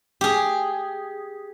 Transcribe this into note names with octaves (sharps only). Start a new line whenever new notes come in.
G4 G#4